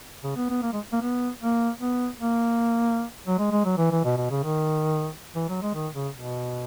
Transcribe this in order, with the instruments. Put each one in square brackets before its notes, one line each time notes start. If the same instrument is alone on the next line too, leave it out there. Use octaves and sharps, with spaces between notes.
[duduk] C#3
B3
B3
A#3
G#3
A#3
B3
A#3
B3
A#3
F#3
G#3
G#3
F#3
E3
E3
B2
B2
C#3
D#3
E3
F#3
G#3
D#3
C#3
B2